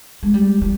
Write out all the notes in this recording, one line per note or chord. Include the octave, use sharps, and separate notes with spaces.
G#3
G3
G3